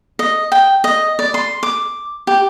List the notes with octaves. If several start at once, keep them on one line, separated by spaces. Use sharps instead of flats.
D#5
G5
D#5
D5
C6
D6
G4